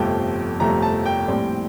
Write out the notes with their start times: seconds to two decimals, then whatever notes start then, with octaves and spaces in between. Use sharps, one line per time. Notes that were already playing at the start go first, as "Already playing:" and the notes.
Already playing: G1 F2 C3 F3 A3 G5
0.60 G1 F2 C3 F3 A3 A#5
0.82 A5
1.06 G5
1.28 A#1 A2 G3 C4